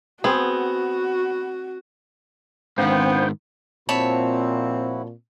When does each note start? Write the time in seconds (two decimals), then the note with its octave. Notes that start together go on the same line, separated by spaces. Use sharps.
0.24 B3 C4 F#4 G#4
2.78 G#2 D#3 B3 C4 D4 C5 F5 G5
3.89 A#2 F3 C4 E4 F#4 C#5 A5 B5